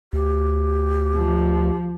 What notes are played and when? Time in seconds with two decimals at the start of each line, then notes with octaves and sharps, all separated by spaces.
0.13 D2 G4
1.16 F3